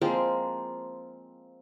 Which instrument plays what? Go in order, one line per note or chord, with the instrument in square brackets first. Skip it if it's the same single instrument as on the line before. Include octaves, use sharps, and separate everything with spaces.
[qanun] F3 G#3 A#3 C4